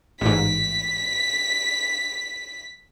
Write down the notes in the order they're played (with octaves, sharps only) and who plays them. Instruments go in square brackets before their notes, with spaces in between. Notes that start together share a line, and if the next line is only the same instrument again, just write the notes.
[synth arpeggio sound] A1 G#2 [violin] B6